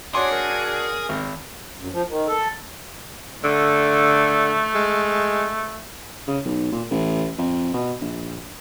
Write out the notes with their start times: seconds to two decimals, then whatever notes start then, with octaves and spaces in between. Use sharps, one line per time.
0.14 D4 F#4 G#4 C#5 C6 D6
0.32 A#4
1.09 G#1
1.79 F#2
1.91 F3
2.08 D#3
2.28 A4
3.44 D3 A3
4.75 G#3
6.27 C#3
6.45 B1
6.72 A#2
6.90 A1
7.38 F2
7.74 B2
8.01 A#1